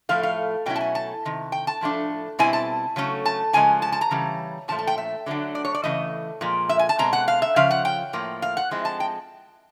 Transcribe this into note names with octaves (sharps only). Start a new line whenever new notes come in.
A2 F3 A3 F5
F5
B2 F#3 A3 C#4 E4 G5
A5
G#5
A5
C3 D#3
G5
A5
A2 F3 A3 D4
B2 G3 C4 E4 G#5
A5
C#3 F#3 A3 C#4
A5
C#3 F3 G#3 G#5
A5
A5
A#5
C#3 E3 G3
A#2 F3 A3 A5
A5
G5
E5
D3 F#3 A3 D4
D5
C#5
D5
C#3 E3 A3 D#5
A#2 F3 G#3
E5
G#5
A5
B2 G#3 C4 A#5
F#5
F5
E5
C#3 F3 F5
F#5
G5
A2 F3 A#3
F5
F#5
F3 G#3 C4 E4
A5
G5